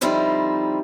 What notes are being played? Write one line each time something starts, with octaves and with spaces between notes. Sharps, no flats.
D3 F3 G3 C4 D#4 E4